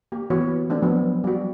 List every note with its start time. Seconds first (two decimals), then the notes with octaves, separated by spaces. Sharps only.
0.12 A#3 G4
0.30 E3 B3 F#4 B4 C#5
0.69 E3 A3 C4 D4
0.82 F3 F#3 B3 D4
1.24 G3 F#4